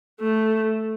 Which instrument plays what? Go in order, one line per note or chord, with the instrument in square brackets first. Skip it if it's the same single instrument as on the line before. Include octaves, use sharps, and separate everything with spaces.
[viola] A3